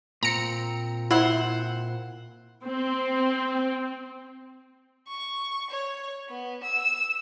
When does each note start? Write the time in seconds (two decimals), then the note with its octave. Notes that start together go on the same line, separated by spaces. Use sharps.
0.23 A#2 C4 A#5 C#7
1.11 E4 C5 F#5
2.65 C4
5.08 C#6
5.71 C#5
6.29 B3
6.64 E6